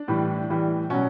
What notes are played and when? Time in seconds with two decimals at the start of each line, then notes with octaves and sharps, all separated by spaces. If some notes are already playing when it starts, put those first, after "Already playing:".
Already playing: D4
0.08 A2 E3 G3
0.50 A2 E3 G3
0.90 B2 F#3 C#4